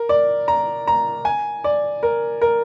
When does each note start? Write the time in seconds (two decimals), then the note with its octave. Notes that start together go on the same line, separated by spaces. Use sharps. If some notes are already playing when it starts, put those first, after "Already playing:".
Already playing: A#4
0.09 D5
0.48 A#5
0.88 A#5
1.25 G#5
1.64 D5
2.03 A#4
2.42 A#4